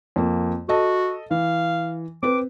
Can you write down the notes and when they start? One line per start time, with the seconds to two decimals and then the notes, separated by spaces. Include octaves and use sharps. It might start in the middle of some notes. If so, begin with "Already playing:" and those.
0.16 F2 A#3
0.69 F#4 A4 D#5 A5
1.31 E3 F5
2.23 C4 B4 D6